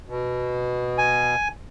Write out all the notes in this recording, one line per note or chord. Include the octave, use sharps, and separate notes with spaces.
B2
G#5